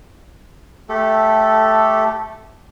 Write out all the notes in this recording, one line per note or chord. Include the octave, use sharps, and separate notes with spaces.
A3 G4 A4